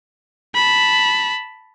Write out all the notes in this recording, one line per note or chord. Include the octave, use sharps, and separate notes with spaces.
A5 B5